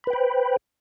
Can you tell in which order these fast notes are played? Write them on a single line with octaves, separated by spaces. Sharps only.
B5 B4 G5 C5